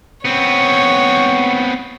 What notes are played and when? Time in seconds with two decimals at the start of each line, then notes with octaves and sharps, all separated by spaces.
0.25 B3 C4 C#5